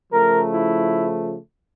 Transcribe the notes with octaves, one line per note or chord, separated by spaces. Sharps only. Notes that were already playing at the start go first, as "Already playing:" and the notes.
C#3 F3 A3 A#4
E4